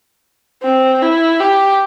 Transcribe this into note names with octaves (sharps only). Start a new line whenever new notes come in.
C4
E4
G4